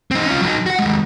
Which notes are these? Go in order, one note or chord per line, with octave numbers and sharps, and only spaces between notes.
C4 D#4
C#4 F4
F#3 D#4
F#4 F#5
D#2 G#3